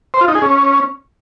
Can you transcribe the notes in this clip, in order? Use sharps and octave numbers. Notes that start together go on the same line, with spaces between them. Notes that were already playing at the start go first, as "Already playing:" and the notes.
C5
F4
D#4
G#4
C#4